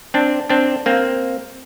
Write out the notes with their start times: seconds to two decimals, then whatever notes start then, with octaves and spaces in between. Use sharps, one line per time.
0.14 C4 D4
0.50 C4 D4
0.86 A#3 C4